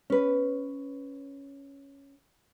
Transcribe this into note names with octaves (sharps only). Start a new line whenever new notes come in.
C#4 B4